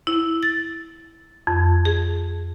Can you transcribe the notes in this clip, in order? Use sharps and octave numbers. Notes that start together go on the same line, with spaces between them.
E4
A6
F2
G#4